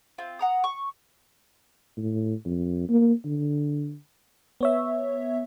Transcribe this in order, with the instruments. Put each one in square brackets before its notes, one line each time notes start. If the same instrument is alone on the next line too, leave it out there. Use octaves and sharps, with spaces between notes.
[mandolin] C4 F4
F#5 A#5 D#6
C#6
[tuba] A2
F2
A#3
D3
[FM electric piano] B3 C#5 E5